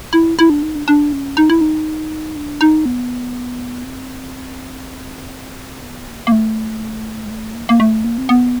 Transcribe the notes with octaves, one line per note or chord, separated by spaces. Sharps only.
E4
E4
D4
D#4
D4
D4
C#4
D#4
E4
D#4
D4
D#4
B3
C4
B3
A#3
A#3
A3
G#3
A3
A#3
A#3
A3
A#3
C4
B3